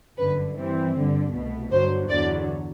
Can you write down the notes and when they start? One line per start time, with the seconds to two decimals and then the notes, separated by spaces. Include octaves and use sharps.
0.17 G1 F#2 D3 B4
0.56 G2 E3 G3 C4
0.94 G2 D3 G3
1.33 C2 B2 A3
1.71 G1 G2 D3 F#3 C5
2.09 E2 D3 F#3 D5